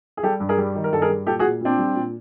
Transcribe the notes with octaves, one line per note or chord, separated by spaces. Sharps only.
G#4
G3 G4 A4
G2
G#4 A#4
G3
D#3
A#4
G2 A4
G#4 A#4
G3
A#2 G4 A4
F#4 G#4
A#2
A#2 C4 D4
G3
A#2